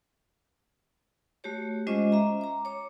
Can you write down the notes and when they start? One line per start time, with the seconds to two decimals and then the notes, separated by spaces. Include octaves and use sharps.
1.44 A3 F#4 G4 C#5
1.87 G#3 C#4 F4 C5 D#5 D6
2.12 E5 A#5
2.41 A#5 D6
2.65 C#5 D6